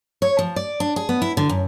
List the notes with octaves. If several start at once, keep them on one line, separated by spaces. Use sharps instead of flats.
C#5
F3
D5
D4
G#4
B3
E4
D3
F#2